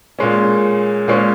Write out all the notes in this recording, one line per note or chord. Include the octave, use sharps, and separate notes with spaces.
A#2 G#3 C#4
A#2 G#3 C#4